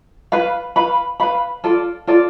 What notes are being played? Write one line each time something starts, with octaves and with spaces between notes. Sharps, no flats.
B4 F5 B5
B4 F5 B5
B4 F5 B5
F4 A4 D5
F4 A4 D5